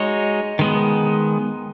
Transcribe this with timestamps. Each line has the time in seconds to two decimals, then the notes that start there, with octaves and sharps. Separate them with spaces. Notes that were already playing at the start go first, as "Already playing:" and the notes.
Already playing: G#3 D#4 F#4 C#5
0.59 D#3 G#3 B3